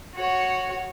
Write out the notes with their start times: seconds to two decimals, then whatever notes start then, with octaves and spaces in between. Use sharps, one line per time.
0.15 F#4 C#5